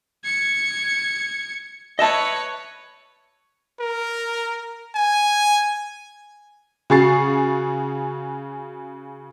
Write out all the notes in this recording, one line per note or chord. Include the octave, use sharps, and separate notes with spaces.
G#6 C#7
B4 C#5 D#5 E5 A5
A#4
G#5
C#3 F#4 G#4 C#6 A6 C7